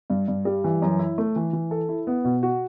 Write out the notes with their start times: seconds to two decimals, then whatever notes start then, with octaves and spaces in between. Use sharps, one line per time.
0.10 G2
0.28 G2
0.45 G3
0.64 E3
0.82 F#2
0.99 E4
1.18 A3
1.36 E3
1.53 E3
1.71 A4
1.89 E4
2.07 B3
2.25 B2
2.43 F#4